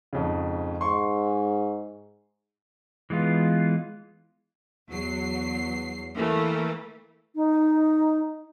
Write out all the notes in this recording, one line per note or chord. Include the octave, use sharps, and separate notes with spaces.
F2 G#2 C#3
G#2 C6 C#6
E3 G#3 B3 F4
E2 F#3 C7
E3 A3 A#3
D#4